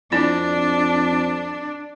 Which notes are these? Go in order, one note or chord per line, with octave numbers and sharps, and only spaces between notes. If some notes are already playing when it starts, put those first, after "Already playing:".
F2 C4 D4 E4 D5